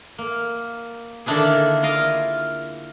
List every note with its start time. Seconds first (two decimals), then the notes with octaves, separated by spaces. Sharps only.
0.18 A#3
1.26 D3 D#3 A#3 D4 E4 G#4
1.82 E4 F4 A#4 D#5 F5